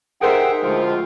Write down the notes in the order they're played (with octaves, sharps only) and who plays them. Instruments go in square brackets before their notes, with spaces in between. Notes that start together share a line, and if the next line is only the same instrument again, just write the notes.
[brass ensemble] D#4 G4 E5 [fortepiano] G#4 A#4 C5 [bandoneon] F#5 G5
[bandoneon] D2 F3 [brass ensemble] G#3 F4